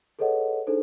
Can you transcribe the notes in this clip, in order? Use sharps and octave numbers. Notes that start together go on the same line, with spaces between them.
G#4 A4 B4 C#5 D#5 F#5
D4 D#4 G#4 A4 C5